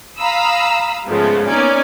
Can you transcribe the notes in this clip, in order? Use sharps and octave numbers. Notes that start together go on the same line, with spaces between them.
F5 A#5 B5 D#6 E6
G#2 C#3 F3 G#3 A3 B3
A#3 B3 C#4 D#4 D5 G#5